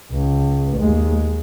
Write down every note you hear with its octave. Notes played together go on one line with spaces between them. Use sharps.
C#2
D#2 G#3